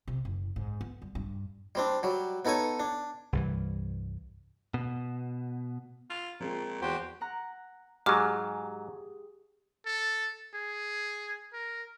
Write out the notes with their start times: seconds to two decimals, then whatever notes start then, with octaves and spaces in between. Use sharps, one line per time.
0.08 C3
0.25 F#1
0.56 G#2
0.81 B3
1.02 G3
1.15 G2
1.75 G3 C4 D4
2.03 F#3 G3
2.45 B3 D#4 A4 C#5 G#5
2.79 D4
3.33 C2 G2 E3
4.74 B2
6.10 F4
6.40 A#2 F3 G#3 C4
6.82 E2 F#4 G4 C5
7.21 F#5 A#5 F#6
8.06 G#2 F#3 G4 G#4 D6 F6
9.86 A4
10.54 G#4
11.53 A#4